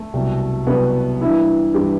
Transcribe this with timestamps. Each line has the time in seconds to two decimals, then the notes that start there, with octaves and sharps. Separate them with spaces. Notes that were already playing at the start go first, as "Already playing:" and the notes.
Already playing: A3
0.13 C2 B2 F#3
0.66 C2 B2 F#3 B3
1.21 G2 E3 E4
1.74 G2 E3 G4